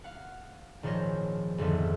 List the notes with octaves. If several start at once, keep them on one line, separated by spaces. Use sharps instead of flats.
F5 F#5
G#1 A#2 F3 C5 C#5 A#6
G#1 F2 D3 F3 B3 E5